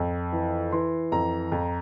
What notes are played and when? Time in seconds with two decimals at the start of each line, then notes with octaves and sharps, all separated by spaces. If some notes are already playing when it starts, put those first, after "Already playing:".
Already playing: F2
0.32 E3
0.72 E3 C6
1.12 F2 A#5
1.52 F2